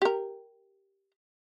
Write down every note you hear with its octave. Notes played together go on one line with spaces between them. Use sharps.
G4 A#4